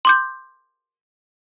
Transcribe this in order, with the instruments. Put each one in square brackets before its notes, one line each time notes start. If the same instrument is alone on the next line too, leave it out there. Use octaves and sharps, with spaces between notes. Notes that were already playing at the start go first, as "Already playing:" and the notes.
[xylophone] C6 D6 G6